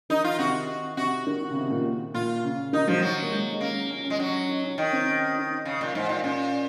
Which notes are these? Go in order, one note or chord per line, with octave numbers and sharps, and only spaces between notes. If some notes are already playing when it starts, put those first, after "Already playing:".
D#3 D#4
F4
C3 F#4
C3 F#4
D#3
C#3
C3
A#2
A#2 F4
C#3
D#3 D#4
F3 F#3
F#3
A#3
G#3
D#4
A#3 C#4
C#4
C#4
G#3
F#3 C#4
D#4
C#4
D#3 C#4
C4
C#4
D#4
C#3
A#2
G#2
A#2
A#2 C#4